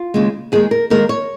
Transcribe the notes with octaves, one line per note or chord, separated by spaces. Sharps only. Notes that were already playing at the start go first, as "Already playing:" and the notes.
Already playing: F4
D#2 C#3 G#3
D#2 D#3 G#3 G#4
A#4
D#2 D#3 G#3 A#4
C#5